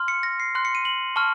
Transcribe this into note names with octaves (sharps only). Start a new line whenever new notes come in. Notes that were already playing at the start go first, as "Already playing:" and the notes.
Already playing: C6 F6
C#7
A#6
C7
C6 F#6
C#7
D#7
F#7
A5 C#6 F6